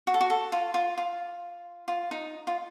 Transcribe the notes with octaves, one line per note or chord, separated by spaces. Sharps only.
F#4
A4
F#4
A4
F4
F4
F4
F4
D#4
F4